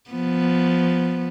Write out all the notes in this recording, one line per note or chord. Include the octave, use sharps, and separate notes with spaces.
F3 B3